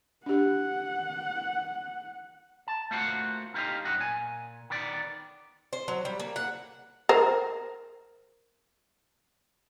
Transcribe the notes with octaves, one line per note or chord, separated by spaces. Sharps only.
D4 G4 F#5
A5
A3 A#3 F4 F#4 C5 F#5
D#4 F4 G4 C#5 D#5 F5
F#2 D#5 F#5
A#2 G#5
D#3 B3 D5
C5
F#3
G3
A#3
F#5
A#4 C5